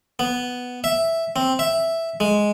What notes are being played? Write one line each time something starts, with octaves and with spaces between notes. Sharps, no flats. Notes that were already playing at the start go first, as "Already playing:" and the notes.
B3
E5
C4
E5
G#3